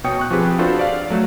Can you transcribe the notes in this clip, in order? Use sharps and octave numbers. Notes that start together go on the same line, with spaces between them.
B2 C#5 G5 D#6 C#7
C#6 F#6
F3 C4 G4 G#4 B4
D4 F4 F#4 A4 B4 C5
D5 F5
F#3 A3